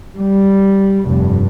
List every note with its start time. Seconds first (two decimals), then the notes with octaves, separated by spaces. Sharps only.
0.19 G3
1.08 F1 G2